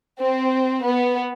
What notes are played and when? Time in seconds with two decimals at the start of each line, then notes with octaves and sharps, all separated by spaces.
0.20 C4
0.85 B3